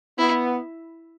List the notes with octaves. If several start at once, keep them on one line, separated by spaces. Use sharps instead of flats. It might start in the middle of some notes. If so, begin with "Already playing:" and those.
B3 E4